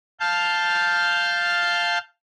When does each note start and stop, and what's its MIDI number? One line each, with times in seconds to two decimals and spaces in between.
0.20 1.98 77
0.20 1.98 81
0.20 1.98 89
0.20 1.98 91